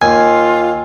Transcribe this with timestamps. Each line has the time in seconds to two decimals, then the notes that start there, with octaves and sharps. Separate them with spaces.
0.02 D#2 F4 G#5